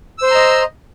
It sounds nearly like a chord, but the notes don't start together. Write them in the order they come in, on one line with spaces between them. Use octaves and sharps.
E6 C5 C6 A#5 D#5